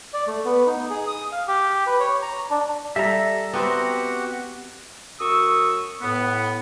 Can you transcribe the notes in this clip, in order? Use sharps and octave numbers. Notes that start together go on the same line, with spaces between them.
D5
A3
B3
D#4
G#4
D#6
F5
G4
B4
C#5
A#5
D4
G3 A4 E5 A#5
B3 C4 F#4 G4 C5 F#5
F#2 F#4 C#6 D#6 E6
A2 B3